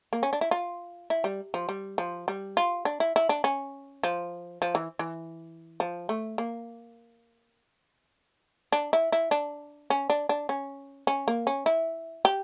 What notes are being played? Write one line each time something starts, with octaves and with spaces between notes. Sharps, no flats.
A#3
C#4
D4
E4
F4
E4
G3
F3
G3
F3
G3
F4
D4
E4
E4
D4
C#4
F3
F3
E3
E3
F3
A3
A#3
D4
E4
E4
D4
C#4
D4
D4
C#4
C#4
A#3
C#4
E4
G4